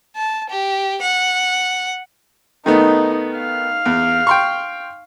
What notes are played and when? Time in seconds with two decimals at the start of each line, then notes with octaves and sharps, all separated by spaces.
0.16 A5
0.49 G4
1.01 F#5
2.66 D#3 A3 B3 D#4
3.37 F5
3.86 E2
4.27 G5 C6 C#6